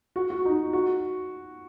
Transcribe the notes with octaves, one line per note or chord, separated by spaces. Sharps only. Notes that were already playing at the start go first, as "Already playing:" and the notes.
F#4
F#4
D#4
F#4